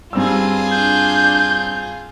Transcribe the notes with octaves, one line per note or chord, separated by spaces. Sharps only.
G2 G3 C4 F4 G#4 E6
D4 G6